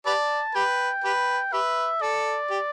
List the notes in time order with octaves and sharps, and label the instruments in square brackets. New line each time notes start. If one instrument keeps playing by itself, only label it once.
[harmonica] G4 B4 D5 [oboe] A5
[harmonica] G4 B4 [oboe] G5
[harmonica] G4 B4
[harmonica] G4 B4 [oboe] E5
[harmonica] A4 [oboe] D5
[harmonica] G4